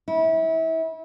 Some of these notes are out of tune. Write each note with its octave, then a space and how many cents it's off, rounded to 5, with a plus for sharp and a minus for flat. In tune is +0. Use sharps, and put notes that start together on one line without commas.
E4 -30